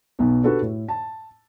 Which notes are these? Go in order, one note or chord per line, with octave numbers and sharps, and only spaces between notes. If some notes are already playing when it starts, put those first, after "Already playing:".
B1 B2
D4 F#4 G4 A4 B4
A2
A5